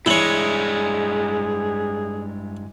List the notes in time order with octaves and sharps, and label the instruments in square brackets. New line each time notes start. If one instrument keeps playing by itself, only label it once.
[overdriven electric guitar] G2 G#3 [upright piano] E3 F#7 [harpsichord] E4 C#5 [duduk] G#4